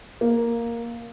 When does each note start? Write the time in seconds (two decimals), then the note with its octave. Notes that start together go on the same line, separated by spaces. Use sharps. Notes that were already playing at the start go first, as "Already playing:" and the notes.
0.21 A#3